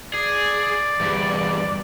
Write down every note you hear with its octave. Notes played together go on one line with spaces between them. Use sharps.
G#4 D5
E2 G2